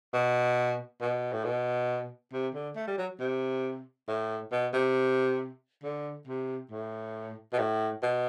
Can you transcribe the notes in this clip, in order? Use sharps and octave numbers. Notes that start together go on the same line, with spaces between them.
B2
B2
A2
B2
C3
D3
A3
G3
F#3
C3
A2
B2
C3
D3
C3
A2
B2
A2
B2